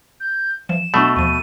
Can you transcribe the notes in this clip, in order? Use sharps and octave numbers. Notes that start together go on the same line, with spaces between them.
G6
E3 F3 E7
B2 F#3 A3 D4
D#2 F3 D#7